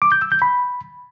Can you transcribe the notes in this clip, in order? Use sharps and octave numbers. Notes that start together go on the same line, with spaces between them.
D6
G6
E6
G6
B5